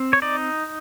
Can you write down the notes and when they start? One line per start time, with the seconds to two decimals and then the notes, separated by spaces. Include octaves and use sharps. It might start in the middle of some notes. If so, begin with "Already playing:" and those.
Already playing: C4
0.13 C#5
0.22 D#4 D5